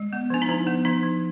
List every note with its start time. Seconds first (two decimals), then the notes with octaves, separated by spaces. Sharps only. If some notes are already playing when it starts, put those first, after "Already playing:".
Already playing: G#3
0.13 B3
0.30 F3 D4
0.42 D#4
0.49 F3 E4
0.67 B3
0.85 F3 D#4
1.03 F3